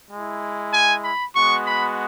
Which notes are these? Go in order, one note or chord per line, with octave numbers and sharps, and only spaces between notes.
G#3 E4
G#5
B5
G#3 B3 F#4 C#6
B5